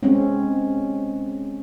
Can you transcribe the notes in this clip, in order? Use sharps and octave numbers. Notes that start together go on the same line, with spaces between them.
G#3 C4 C#4